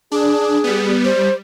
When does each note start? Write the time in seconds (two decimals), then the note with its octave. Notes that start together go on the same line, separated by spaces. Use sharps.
0.12 D4 G#4
0.64 G3 B3
1.05 G3 C5